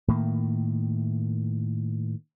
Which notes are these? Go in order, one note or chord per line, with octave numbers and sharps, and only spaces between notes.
A2 D#3 A#3